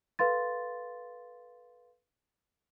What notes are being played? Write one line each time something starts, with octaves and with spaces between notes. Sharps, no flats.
A4 B4 F5 C6 A6